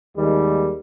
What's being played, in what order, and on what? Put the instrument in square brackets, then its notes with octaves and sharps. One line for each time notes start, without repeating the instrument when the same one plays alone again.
[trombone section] D#2 D#3 G3 G#3